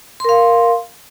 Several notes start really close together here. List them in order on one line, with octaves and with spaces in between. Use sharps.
C6 A#4 F5